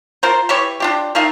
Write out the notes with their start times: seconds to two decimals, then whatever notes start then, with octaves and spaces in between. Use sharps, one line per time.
0.23 F4 A#4 C5
0.49 E3 G4 C#5
0.80 D4 F4 G4
1.15 D#3 A3 D#4 F5